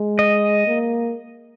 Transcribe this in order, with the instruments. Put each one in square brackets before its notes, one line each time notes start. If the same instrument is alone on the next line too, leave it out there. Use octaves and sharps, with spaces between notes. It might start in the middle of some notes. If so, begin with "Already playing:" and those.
Already playing: [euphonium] G#3
[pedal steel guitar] D#5
[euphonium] A#3